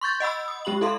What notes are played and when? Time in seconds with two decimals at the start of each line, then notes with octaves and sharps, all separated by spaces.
0.01 C6 C#6 G6 A6
0.20 D#5 F#5 B5 E6
0.48 D#6
0.65 G#3 G4 B5 F#7
0.81 E4 A4 E5 F5 C6